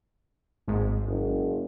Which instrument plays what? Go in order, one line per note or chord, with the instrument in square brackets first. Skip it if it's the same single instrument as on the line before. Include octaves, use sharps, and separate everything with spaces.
[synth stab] G#1 G#2
[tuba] F#1